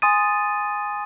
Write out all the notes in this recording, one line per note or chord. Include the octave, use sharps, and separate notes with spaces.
G#5 C6 D#6 A6 D#7